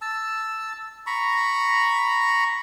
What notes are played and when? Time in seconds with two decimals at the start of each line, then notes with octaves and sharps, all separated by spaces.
0.01 A5 E6
1.07 A#5 B5 C#6